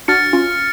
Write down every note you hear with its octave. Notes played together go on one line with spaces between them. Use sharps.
D4 F#4 F6 A6 C#7
C#4 F4